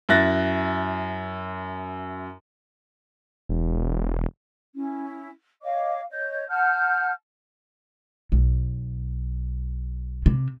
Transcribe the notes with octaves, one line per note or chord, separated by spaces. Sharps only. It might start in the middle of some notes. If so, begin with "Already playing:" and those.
F#2 E4 F#6 A6 A#6
E1
C#4 E4
C#5 D#5 F5 D6
C#5 D#5 G6
F#5 A5 F6 G6
B1
C3